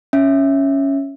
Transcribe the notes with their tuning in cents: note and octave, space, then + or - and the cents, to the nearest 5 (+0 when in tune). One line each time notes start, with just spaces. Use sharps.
C#4 +0 E5 +0